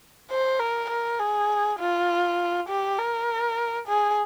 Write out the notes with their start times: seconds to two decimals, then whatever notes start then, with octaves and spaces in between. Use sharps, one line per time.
0.31 C5
0.60 A#4
0.90 A#4
1.19 G#4
1.79 F4
2.69 G4
2.98 A#4
3.87 G#4